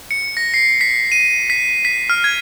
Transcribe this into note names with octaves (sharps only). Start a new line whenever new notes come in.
C#7
A#6
C7
B6
D#7
B6
B6
F6
G#6